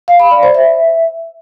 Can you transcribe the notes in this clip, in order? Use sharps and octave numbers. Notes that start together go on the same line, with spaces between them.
F5
B5
D5
C5
E5